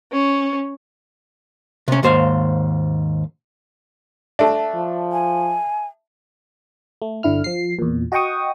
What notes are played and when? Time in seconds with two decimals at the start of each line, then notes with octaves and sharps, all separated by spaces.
0.12 C#4
1.88 C3 C#4
2.03 D#2 G#2 C5 F5
4.39 A3 D4 E5 A5
4.75 F3
5.12 G#5
7.02 A3
7.23 G1 D3 E4 F6
7.44 F3 C7
7.79 E2 A#2
8.12 F#4 D#5 F#5 G5 C#6 D#6